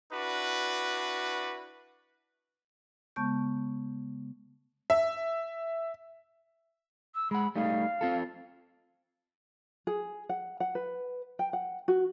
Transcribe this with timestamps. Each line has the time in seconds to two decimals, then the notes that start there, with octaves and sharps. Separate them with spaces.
0.12 D4 E4 F#4 B4
3.16 C#3 G#3 B3 A5 C#6 G6
4.90 E5
7.15 E6
7.31 G#3 F#5 B5
7.56 G3 A3 D#4 F5
8.01 C4 F4 A4
9.87 G#4
10.29 F#5
10.60 F#5
10.75 B4
11.39 G5
11.53 F#5
11.88 F#4